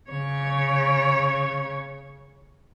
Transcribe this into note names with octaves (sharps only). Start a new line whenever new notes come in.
C#3 C#5